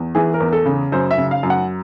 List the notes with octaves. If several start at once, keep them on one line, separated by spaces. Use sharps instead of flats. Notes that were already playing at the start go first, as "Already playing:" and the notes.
Already playing: E2
E3 G#4
A#4
E2
A4
C#3
F#2 C5
E5
C#3
F5
F#2
F#5